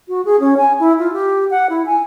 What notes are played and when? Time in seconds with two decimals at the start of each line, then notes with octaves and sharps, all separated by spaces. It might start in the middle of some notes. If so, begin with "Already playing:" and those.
0.08 F#4
0.25 G#4
0.40 C#4
0.57 G#5
0.80 E4
0.99 F4
1.13 G4
1.51 F#5
1.70 E4
1.86 G#5